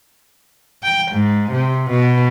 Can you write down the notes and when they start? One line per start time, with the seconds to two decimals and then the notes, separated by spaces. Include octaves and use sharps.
0.83 G5
1.12 G#2
1.51 C3
1.91 B2